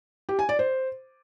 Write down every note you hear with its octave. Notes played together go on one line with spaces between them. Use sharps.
G4
G#5
D5
C5